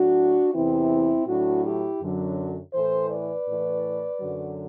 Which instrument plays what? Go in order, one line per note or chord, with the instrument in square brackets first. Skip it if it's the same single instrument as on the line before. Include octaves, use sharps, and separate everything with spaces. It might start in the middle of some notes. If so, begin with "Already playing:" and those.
Already playing: [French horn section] A2 F#3 D4 F#4
E2 C3 E3 C4 E4
A2 F#3 D4 F#4
E4 G4
F#2 D3 F#3
A2 E3 A4 C5
B4 D5
A2 E3
F#2 D3 F#3